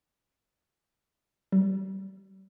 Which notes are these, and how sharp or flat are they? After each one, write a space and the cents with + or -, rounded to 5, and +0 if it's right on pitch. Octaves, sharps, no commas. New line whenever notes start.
G3 -35